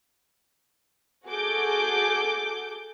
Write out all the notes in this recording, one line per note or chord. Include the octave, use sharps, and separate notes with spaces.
F#4 G#4 A4 D6 G6